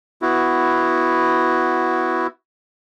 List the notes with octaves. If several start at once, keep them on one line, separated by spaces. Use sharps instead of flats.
B3 E4 F#4